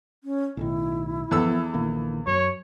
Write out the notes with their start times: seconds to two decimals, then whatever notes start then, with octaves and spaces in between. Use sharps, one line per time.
0.24 C#4
0.57 B1 A2 D#3 E4
1.31 E2 F3 B3 A4 E6
1.74 A#1 D#3 A#3
2.27 F#2 C#5